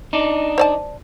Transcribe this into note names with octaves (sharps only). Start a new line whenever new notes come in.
D4 D#4
C5 D5 A5